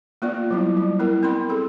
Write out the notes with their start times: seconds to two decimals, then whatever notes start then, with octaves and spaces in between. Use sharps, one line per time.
0.22 A#3 B3 F4 D5
0.51 F#3 G3 E4
0.77 G3
0.99 B3 E4 A#4
1.23 C4 B5 C6
1.49 G#4 A4